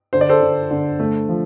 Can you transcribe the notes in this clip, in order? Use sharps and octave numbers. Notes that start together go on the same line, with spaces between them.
D3 C5
D5
A4 C5
D3
D3
A3
F3